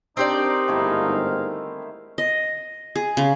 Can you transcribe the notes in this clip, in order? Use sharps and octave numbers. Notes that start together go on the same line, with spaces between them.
C4 D4 D#4 G4 A#4 C5 D5
G1 G#2 D#3 A3 E4 F5
D#5
G#4
C#3